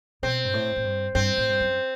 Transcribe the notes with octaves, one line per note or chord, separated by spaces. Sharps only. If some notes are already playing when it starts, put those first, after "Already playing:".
B2 C4
G2
A2
A2
G2
G2 C4
A2
G2
F#2